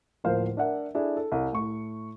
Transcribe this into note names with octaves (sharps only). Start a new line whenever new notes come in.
D1 F3 A#3 C5 F5
D4 A#4 E5 F#5
D4 E4 G#4 A4
A4
C2
A2 C#6